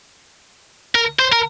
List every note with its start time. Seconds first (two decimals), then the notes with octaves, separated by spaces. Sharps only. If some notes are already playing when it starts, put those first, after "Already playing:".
0.95 A#4
1.19 C5
1.32 A#4